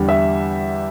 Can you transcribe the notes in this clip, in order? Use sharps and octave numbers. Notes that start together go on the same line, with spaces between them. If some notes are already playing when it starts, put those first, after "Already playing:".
Already playing: E2 D3 G3
E5